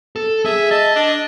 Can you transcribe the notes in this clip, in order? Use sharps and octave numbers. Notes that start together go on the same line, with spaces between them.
A4
G#4 E5
D#5 A5
D4